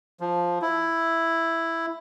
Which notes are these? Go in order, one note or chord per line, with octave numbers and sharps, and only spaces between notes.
F3
E4